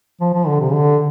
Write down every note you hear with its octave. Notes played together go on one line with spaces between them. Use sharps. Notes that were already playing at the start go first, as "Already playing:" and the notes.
F3
F3
D3
C3
D3